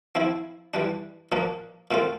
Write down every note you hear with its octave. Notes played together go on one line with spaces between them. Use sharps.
F3 C4 E4
E3 G3 D4
A#2 F3 A#3 D4
A#2 A3 C4 F4